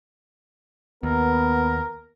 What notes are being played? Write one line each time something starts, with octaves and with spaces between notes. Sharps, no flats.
D#2 B3 A#4